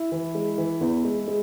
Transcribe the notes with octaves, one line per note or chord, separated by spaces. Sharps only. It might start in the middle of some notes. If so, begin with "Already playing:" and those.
Already playing: E4
E3
G#3
E3
E2
G#3
G#3